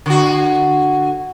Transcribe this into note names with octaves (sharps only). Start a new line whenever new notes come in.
D3 F#4